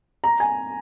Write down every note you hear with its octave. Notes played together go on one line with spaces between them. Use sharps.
A#5
G#5